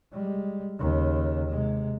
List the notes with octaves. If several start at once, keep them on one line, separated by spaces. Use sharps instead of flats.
G3 G#3
D#2 C#3
C3 G#3